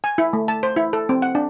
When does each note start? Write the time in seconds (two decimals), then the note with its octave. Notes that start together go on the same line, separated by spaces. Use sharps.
0.04 G#5
0.18 E4
0.33 A3
0.48 A5
0.63 C5
0.76 E4
0.93 A4
1.09 C4
1.22 F#5
1.35 D4